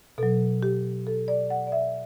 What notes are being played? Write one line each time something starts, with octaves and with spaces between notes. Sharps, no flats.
B2 F#3 A4
G4
A4
D5
F#5
D5
E5